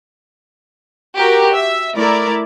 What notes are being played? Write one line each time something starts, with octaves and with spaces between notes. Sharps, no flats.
F#4 G4 A#4
E5
A3 E4 A#4 D5